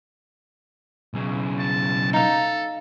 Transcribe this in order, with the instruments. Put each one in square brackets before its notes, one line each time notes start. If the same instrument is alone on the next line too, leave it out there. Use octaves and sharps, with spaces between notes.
[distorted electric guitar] B1 C#3
[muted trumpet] A5
[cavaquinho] D#4 F5 [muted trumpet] A4